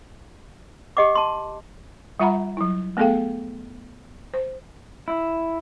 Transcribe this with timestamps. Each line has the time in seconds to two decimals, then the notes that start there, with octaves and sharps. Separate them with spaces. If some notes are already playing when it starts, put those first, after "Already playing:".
0.97 G4 D#5 F#5 D6
1.15 A5 C6
2.20 G3 F4 E5 F#5 A#5 B5
2.57 F#3 E4
2.97 A3 B3 G#4 A4 F5 G5
4.34 C5
5.08 E4